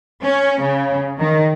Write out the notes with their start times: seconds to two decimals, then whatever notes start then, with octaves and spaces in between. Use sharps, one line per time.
0.22 C#4
0.61 C#3
1.19 D#3